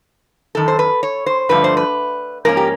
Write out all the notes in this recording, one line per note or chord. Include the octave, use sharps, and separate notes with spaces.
F#2 D#3 A4
C5
B4
C#5
C5
G2 D3 F3 A3 B4
C5
B4
G#2 F3 A#3 C#4 A#4
G4